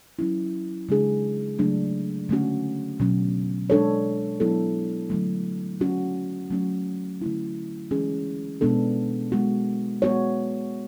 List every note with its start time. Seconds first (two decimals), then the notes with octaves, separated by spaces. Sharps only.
0.19 F#3 C#4 E4
0.89 C#3 G#3 D4 G#4
1.58 C#3 F#3 A3 D4
2.29 D3 A3 C#4 F#4
3.00 B2 F#3 C#4
3.70 G#3 D4 A4 C#5
4.40 F#3 B3 E4 A4
5.10 D3 F#3 A3
5.80 F#3 C#4 F#4
6.51 F#3 A3 C#4 F#4
7.21 D3 A3 E4
7.91 E3 G#3 C#4 G#4
8.61 B2 G#3 B3 D4 A4
9.32 G#3 B3 F#4
10.02 G#3 B3 F#4 C#5